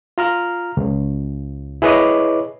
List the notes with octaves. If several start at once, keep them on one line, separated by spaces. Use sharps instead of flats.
F4 A#5 F6
C#2
E4 G#4 B4 C#5 D#5 D6